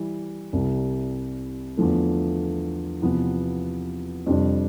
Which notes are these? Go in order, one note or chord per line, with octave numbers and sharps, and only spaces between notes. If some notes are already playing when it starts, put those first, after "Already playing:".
Already playing: E3 G3 E4
C2 C3 G3
E2 D3 F3 A3
E2 C3 F3 B3
F2 C3 G3 D4